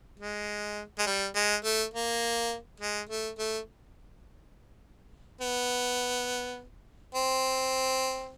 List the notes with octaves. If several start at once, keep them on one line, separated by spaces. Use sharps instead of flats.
G#3
G#3
G3
G#3
A3
A#3
G#3
A3
A3
B3
C4